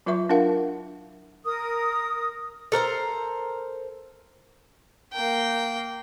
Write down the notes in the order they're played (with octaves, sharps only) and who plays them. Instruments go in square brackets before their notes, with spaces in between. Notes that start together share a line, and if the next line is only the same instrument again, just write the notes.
[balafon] F#3 F4 B4 E5 C#6
D4 E4 F4 A#4 F5 F#5
[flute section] A#4 D#6
[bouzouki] A4 A#4 C5 A#5
[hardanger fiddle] A#3 G5